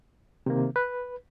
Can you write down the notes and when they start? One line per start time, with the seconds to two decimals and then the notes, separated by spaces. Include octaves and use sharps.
0.46 C3 D#3 A#3
0.76 B4